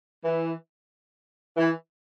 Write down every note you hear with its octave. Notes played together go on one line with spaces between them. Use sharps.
E3
E3